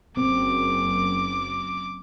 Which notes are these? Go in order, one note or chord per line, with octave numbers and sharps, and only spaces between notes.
F#1 C4 D6